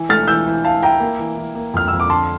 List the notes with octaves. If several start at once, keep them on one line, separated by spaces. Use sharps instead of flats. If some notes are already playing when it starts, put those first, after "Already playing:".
Already playing: E3
A3 F6 A6
E3 E6 G6
E3
E4 F5 A5
E4 G5 A#5
A#3
E3
E3
A#3
F2 F6
F2 E6
D6
D3 A5 C6